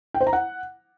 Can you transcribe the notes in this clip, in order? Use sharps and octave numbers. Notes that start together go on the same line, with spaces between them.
G5
C5
A#5
F#5